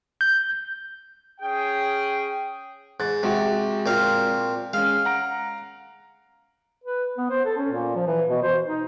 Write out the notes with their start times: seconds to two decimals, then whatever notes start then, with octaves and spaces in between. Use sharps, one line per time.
0.21 G6
1.40 C#4 G#4 G5
3.00 G#2 F#6 A6
3.23 C3 G#3 F#4 G4
3.86 A#2 C4 F5
4.73 G#3 C#4 F5
5.05 F#5 A#5 D7
6.84 B4
7.18 B3
7.30 C5
7.45 A4
7.57 C#4
7.71 A#2
7.95 F3
8.06 E3
8.30 B2
8.42 C5
8.66 D#4